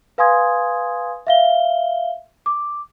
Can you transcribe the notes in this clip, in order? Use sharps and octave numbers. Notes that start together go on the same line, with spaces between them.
B4 F5 G#5 C6 D#6 G#6
E5 F5 G7
D6